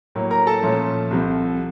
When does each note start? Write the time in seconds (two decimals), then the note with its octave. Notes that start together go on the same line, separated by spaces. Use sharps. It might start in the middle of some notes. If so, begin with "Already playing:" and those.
0.15 A2 F#3 A#3
0.31 A#4 A#5
0.47 A4 A5
0.62 A#2 F3 A3 C#4
1.11 C2 C3 F3